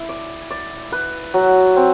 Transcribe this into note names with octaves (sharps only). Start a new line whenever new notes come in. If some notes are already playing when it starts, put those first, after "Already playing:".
Already playing: E4
D5
D5
B4
F#3
C4